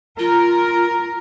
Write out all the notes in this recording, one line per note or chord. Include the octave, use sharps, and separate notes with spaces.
F4 A#4